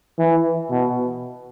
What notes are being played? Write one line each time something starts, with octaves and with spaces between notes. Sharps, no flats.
E3
B2